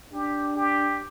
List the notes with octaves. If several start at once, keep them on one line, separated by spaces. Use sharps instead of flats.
D4 G4
G4